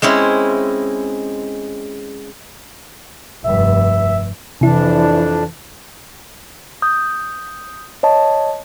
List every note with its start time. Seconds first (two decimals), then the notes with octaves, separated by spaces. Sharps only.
0.02 G#3 C4 C#4 E4
3.44 F1 G2 E5
4.61 F2 C3 E3 D4 E4
6.82 D#6 G6
8.03 C#5 D#5 A5